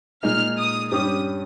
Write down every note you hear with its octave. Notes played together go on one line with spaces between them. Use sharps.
A#2 G#3 D#4 G#4 F6
D#6
G2 G3 C#4 G4 D#6